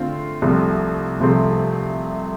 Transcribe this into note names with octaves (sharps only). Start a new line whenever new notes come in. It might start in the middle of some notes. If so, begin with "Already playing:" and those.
Already playing: D3 A3 C4 F4
C2 C3 F3 A3 C4
C2 C3 F3 A3 C4